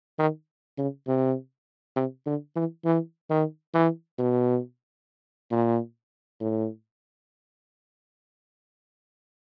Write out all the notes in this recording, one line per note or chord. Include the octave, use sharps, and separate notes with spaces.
D#3
C#3
C3
C3
D3
E3
E3
D#3
E3
B2
A#2
A2